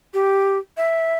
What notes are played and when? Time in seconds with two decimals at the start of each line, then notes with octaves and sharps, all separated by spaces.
0.14 G4
0.77 E5